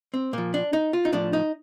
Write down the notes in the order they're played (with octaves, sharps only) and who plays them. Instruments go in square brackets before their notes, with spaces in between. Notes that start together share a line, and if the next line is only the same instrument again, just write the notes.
[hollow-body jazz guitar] C4
A#2 F3 A#3
D4
D#4
F4
D#4
A2 F3 D4
D#4